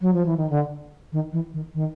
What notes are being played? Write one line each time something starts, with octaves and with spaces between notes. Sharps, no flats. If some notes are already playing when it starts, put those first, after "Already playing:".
F#3
F3
E3
D#3
D3
D#3
E3
D#3
D#3